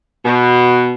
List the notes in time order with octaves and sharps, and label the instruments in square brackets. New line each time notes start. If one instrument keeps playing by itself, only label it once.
[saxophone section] B2